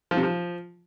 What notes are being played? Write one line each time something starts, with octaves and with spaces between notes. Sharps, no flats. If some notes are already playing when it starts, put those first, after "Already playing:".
F3
C3
F3